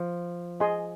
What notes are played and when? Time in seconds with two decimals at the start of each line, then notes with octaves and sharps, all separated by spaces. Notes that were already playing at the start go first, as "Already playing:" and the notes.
Already playing: F3
0.60 G#4 D#5 G#5 C6